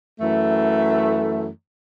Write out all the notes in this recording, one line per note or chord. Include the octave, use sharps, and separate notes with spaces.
F#2 E3 A3